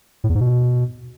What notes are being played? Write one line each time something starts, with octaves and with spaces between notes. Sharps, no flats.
A2
E2
G#2
B2